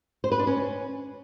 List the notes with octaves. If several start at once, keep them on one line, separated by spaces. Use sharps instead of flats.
C5
B4
D4
C#4